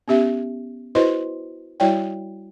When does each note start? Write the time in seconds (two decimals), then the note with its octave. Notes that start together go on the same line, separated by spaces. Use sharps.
0.08 B3 C#4 G4 E5
0.95 E4 F#4 B4 C5 D#5 C6
1.80 G3 E4 F#4 C#5 D5 G5